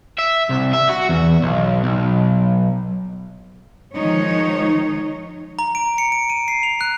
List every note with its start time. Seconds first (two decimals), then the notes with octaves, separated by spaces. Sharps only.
0.18 E5
0.49 C2
0.73 E5
0.89 F#4
1.09 E2
1.43 B1
1.84 B1
3.94 D#3 F3 G#3 D#4 C#5
5.59 A#5
5.75 D7
5.98 C#7
6.12 D7
6.30 D#7
6.48 C7
6.63 F7
6.81 F#6